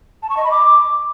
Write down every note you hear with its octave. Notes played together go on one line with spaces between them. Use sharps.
A5
C#6
D#5
B5
D6